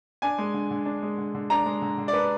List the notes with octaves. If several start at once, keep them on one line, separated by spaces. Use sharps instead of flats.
D4 G#5
G#3
D3
D3
D4
G#3
D3
D3
D4 A#5
G#3
D3
D3
D5
D4 B4